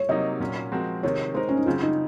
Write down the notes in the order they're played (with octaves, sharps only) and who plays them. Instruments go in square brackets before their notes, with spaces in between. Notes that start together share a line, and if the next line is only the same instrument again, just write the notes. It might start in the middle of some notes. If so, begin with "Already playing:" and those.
Already playing: [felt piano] C#5
[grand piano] C3 F#3 A#3 D#4 [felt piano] D#5
[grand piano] A#2 F#3 C#4
F3 G#3 C4 F#4 A#4
[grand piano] C3 D#3 G#3 [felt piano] C#5
[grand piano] G#3 D#4 A#4 [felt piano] C5
[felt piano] C#4
D#4
[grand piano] C#3 F#3 C4 [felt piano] F4
[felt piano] D#4